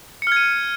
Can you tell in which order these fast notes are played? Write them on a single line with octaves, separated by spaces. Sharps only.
C#7 F6 G#6 D#7